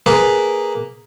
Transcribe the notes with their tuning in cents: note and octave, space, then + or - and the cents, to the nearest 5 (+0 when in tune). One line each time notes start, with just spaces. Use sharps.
A#3 +0 G#4 +0 B4 +0